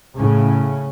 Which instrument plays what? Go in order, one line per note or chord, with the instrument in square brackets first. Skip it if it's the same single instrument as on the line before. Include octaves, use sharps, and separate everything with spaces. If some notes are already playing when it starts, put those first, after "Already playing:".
[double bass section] A2 C#3 C#4